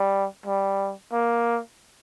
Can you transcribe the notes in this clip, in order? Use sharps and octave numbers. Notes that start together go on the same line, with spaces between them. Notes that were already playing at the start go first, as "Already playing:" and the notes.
Already playing: G3
G3
A#3